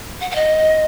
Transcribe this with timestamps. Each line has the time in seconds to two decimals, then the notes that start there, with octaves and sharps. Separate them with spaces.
0.21 F#5
0.31 F#5
0.35 D#5